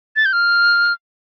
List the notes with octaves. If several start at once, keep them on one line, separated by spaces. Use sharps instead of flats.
A6
G6
F6